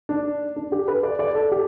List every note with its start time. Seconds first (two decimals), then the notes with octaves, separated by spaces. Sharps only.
0.09 D4
0.56 D4
0.72 G4
0.88 B4
1.03 D5
1.19 D5
1.35 A4
1.52 G4